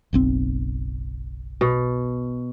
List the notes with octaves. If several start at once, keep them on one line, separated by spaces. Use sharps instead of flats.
F#1 B1 C4
B2